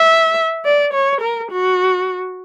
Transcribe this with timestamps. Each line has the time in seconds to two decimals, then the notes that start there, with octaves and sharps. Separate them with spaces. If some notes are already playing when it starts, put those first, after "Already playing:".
Already playing: E5
0.65 D5
0.93 C#5
1.21 A#4
1.51 F#4